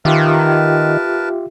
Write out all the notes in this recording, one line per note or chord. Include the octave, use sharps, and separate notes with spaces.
D#3 F4 G4 A#4 B4 E5 A5